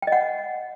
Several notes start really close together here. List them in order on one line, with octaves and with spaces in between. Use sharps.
G5 D#5 F#5